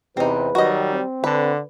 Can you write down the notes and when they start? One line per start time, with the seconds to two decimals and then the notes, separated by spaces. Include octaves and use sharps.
0.17 E2 C3 C4 D#4 B4
0.55 D#3 F#3 G3 F#4 D#5
0.92 C4
1.24 D3 B4